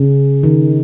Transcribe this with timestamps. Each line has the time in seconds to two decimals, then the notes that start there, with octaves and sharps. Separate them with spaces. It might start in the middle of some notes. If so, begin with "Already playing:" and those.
Already playing: C#3
0.43 D#3